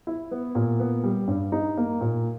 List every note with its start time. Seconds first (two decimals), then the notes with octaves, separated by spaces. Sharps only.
0.07 E4
0.31 B3
0.55 A#2
0.80 B3
1.04 G3
1.28 G2
1.52 D#4
1.77 A#3
2.01 A#2